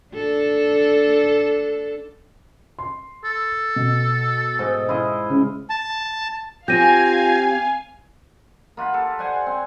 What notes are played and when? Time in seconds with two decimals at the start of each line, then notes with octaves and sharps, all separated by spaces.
0.14 D4 A4
2.79 C6
3.25 A4
3.76 B2
4.59 G#2 D#5
4.89 E4 F4 D#5
5.30 C#3
5.70 A5
6.68 C4 F4 G4 F5 G#5 G6 A#6 D#7
8.77 A#3 F4 F#5 B5
8.94 A4
9.19 C5 D5 F#5 G#5
9.47 C4